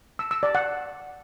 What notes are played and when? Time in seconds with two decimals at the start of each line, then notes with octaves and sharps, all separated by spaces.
0.19 E6
0.31 E6
0.43 D5
0.55 F#5